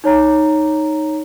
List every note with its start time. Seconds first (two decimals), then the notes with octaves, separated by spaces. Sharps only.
0.04 D#4 C#5 A#5